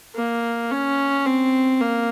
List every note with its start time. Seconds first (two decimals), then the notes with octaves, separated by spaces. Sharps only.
0.15 A#3
0.71 C#4
1.26 C4
1.81 A#3